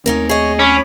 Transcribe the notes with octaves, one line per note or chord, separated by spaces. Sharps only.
D#2 A3 C4 C#4 D#4 A#4
G#4 C#5 D#5
C#4 C#5 B5 D6